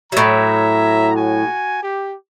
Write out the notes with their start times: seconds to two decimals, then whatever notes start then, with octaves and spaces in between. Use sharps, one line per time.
0.12 A2 F#3 E5 A#5
1.15 F#4 G#5
1.82 G4